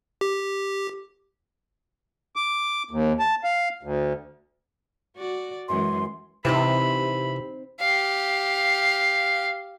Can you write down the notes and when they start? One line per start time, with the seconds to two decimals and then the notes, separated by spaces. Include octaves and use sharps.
0.21 G4
2.36 D6
2.91 D#2
3.19 A5
3.44 F5
3.83 D2
5.16 F#4 D5
5.68 F#2 E3 G#3 C6
6.45 C3 E3 C4 D#4 C5 B5
7.80 G4 F5